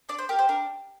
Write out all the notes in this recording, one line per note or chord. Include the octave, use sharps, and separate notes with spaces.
D4 D5
C5
G4 A#4
C5
D4 A#4